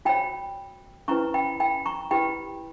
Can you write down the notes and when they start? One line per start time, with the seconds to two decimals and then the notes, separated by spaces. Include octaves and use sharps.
0.05 F#4 C#5 G5 B5
1.08 C#4 E4 B4 A#5 C#6
1.34 G5 B5
1.60 G5 B5
1.86 A#5 C#6
2.11 E4 G4 B4 G5 B5